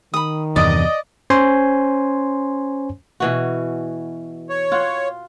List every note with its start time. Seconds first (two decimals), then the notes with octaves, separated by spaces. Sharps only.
0.14 D#3 B5 D#6
0.56 E2 G2 C3 D5 D#5
1.30 C#4 C5 C#5 G#5 C6
3.20 B2 E3 F#4
4.50 C#5
4.72 F4 F#5